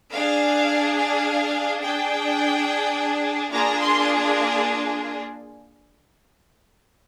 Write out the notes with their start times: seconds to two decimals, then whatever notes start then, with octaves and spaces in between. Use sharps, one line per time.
0.12 D4 G#4 F5
0.97 F5
1.82 D4 G#4 G5
3.52 A#3 D4 F4 G#4 A#5
3.80 C6